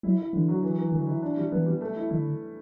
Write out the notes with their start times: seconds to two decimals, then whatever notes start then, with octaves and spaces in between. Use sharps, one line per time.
0.03 F#3 E4
0.18 E4
0.33 D3 E3
0.48 F#3
0.63 E3
0.78 E3
0.92 D3 E3
1.07 E4
1.22 D4
1.37 G3
1.52 E3 B3
1.66 G3
1.81 A3
1.96 E4
2.10 D3 E4